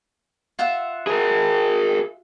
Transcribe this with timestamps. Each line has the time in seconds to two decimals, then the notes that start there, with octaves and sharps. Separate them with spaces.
0.59 F4 E5 F#5
1.07 G#4 A#4